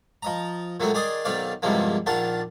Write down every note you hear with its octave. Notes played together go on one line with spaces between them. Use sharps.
F3 D#5 A#5
A#2 F#3 G#3 A3 C4
D#3 G#4 D5 G#5 C6 D#6
B1 D#3 C4 D5 F5
E2 G2 C3 F3 G#3 A#3
A#1 D#3 D4 F4 F#5 A5